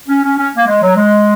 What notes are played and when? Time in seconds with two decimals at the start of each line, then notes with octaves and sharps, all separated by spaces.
0.08 C#4
0.23 C#4
0.37 C#4
0.56 A#3
0.67 G#3
0.81 F#3
0.95 G#3